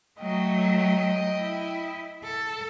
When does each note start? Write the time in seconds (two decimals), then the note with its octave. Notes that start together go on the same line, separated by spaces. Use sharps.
0.20 F#3 A3 D#5 G5
1.38 E4
2.24 A4